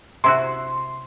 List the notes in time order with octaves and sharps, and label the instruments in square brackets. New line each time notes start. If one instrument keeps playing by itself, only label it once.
[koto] C3 E4 F#4 [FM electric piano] C6